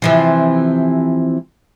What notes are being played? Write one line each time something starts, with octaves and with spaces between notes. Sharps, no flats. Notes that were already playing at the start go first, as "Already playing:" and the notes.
C3 E3 F3